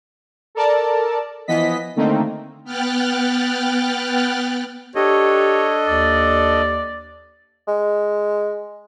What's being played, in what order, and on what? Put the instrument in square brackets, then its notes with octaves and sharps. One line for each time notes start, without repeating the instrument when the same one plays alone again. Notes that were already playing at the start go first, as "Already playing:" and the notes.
[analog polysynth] A4 A#4 D5 A5
E3 F3 B3 D#5 B6
D3 D#3 A3 A#3 C4 D#4
[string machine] B3 G5 F6 F#6 A6
[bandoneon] D4 A4 D#5 [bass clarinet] G4 [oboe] C#5
[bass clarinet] D#2 [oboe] D5
[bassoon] G#3